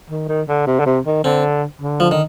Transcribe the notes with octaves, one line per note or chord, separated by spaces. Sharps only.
D#3
D#3
D3
C3
D3
C3
D#3
D3 C4
D3
F3
D#3